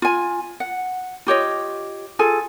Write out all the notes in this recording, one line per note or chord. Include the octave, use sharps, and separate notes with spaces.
F4 G#5
F#5
F4 G4 C#5 D#5
F4 G#4 A4 G#5